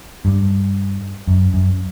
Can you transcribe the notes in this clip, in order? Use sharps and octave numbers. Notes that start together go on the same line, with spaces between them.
G2
F#2
F#2